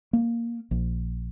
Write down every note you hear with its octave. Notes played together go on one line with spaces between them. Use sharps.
A#3
A#1